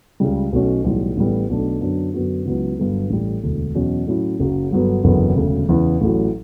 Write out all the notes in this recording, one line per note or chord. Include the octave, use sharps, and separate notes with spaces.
C#2 C#3 G3
B1 B2 A3 C#4 F#4
B1 A2 E3 G3
A1 A2 G3 B3
B1 B2 A3 D4
F#2 D3 F#3 B3 D4
F#2 D3 F#3 B3 F#4
C#2 C#3 F#3 B3 E4
G1 G2 F#3 B3 D4
A1 A2 G3
E1 D2 D3
E2 B2 F#3 C#4 F#4
A2 F#3 C#4 E4
F#1 F#2 C#3 F#3
G1 G2 D3 F#3 B3
F#1 E2 D3 F#3 B3
E1 D2 C#3
E2 C#3 E3 B3
A1 A2 F#3